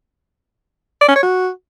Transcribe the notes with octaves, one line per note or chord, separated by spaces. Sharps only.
D5
C#4
C#5
F#4